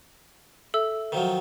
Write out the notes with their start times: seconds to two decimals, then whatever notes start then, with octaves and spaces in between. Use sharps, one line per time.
0.74 A4 E5 E6
1.12 D#3 F3 F#3